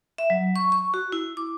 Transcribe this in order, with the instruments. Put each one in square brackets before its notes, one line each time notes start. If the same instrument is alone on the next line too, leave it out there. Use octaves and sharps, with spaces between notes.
[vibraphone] E5
F#3
C#6
C#6
F#4
E4
D6